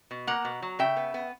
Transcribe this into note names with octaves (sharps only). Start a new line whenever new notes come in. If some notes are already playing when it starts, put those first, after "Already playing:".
B2
A#3 F#5 A#5
B2
F#3
C#3 E5 G5
B3
B3